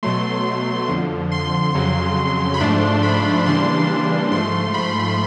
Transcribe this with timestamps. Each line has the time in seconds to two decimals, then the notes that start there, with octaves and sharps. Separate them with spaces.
0.03 B2 F#3 A3 C6
0.88 F2 D3 F3
1.31 C6
1.75 F2 C#3 F#3
2.54 B5
2.60 G#2 F3 A3 D4 C6
3.03 B5
3.46 C#3 E3 G3 A#3 D4 C6
3.89 C6
4.32 G#2 F3 A3 C6
4.74 B5